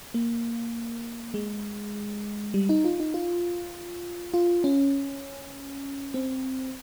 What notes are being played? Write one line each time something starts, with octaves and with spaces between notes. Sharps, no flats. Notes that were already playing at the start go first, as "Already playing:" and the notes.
A#3
G#3
G3
D#4
F4
D#4
F4
F4
C#4
C4